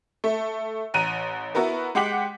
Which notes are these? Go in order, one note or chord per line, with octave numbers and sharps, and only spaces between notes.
A3
A1 A#5 F#6 D#7
B3 E4 F#4 A#4 B4
G#3 G4 F#5 D6 B6 F#7